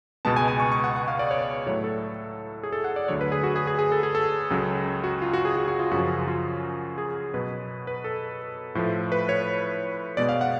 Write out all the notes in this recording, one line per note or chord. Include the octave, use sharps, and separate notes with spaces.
C#2 B2 G#3 B3 A5
G#5
G#5
C#6
C#6
F#5
F#5
F5
D5
C#5
A2 F#3 A3 C#5
A4
G#4
A4
F#5
D5
D2 D3 F#3 C#5
B4
G#4
F#4
G#4
G#4
G#4
A4
G#4
A4
C#2 C#3 F#3
F#4
F4
F#4
G#4
F#4
F#4
F4
F#2 C#3 F3 F#4
F4
G#4
B2 F#3 B3 B4
B4
A4
A2 F3 A3
B4
C#5
B2 G#3 B3 D5
F5
F#5